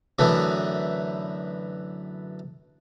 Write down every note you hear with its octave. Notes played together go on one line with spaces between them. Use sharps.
F#2 D3 E3 A3 B3